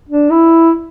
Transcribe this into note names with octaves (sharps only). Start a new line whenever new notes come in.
D4
E4